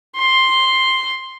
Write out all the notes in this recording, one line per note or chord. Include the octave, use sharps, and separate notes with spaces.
C6